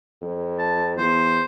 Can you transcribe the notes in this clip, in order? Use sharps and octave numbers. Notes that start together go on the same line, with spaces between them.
F2
A5
E2 C5